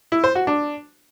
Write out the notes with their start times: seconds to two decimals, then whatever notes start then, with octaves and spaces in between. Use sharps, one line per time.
0.12 E4
0.24 C5
0.35 F#4
0.47 D4